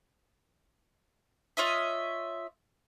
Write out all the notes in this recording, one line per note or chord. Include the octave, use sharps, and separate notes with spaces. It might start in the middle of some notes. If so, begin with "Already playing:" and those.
F4 C#5 D#5 E5